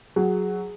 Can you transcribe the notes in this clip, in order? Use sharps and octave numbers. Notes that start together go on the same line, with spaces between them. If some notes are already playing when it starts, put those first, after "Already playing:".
F#3 G#4